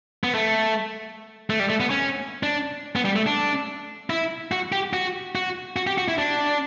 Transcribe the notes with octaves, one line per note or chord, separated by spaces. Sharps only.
B3
A3
A3
G3
A3
B3
C#4
D4
B3
G3
A3
D4
E4
F#4
G4
F#4
F#4
F#4
G4
F#4
E4
D4